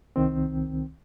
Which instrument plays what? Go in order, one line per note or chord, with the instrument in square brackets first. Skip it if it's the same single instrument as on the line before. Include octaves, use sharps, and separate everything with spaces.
[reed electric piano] C2 D#3 C4